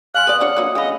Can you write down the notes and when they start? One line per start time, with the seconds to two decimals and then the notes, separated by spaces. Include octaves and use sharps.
0.15 F5 G#5 C6 F6 F#6
0.27 B4 D5 D#6
0.41 F3 D4 C#5 F#5
0.57 F#3 A#3 D#4 F4
0.75 C#3 A3 D4 D#5 F5 B5